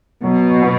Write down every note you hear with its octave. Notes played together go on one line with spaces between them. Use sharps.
B2 F#3
B3